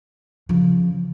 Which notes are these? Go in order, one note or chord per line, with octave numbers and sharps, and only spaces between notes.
C#3 F3